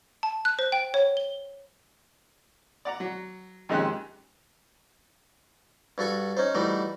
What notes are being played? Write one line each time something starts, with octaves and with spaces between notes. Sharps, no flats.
A5
F#6
C5
G5
C#5
G7
D5 F#5 A#5
F#3
F2 D#3 G#3 C#4 G4 F#6
G2 F#4 A4 C#6
C#4 D#4 C5
E3 G3 A3 D#4 F#4